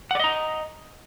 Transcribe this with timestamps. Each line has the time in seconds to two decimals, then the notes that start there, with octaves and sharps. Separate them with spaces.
0.11 F#5
0.15 D5
0.19 D#5
0.24 A#5